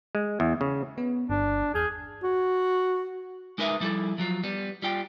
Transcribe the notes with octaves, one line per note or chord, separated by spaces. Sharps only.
G#3
E2
C#3
B3
G1 D4
E2 G#4 F6 G6
F#4
G#3 D#4 A#4 B4 E5
F3 G3 E4 A4
F3 F#3 F4
G3 B3
G3 F4 G5